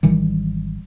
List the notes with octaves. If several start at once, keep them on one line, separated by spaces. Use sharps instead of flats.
G#1 D#3 E3 G3